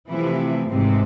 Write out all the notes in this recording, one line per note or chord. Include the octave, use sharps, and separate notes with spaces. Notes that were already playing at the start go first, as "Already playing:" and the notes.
C3 E3 F3 A3 E4
G#2 C3 E3 G#3 C4